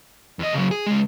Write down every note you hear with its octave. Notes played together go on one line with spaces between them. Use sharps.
E2 D#5
C#3 F#3
G#4
C#2 G#3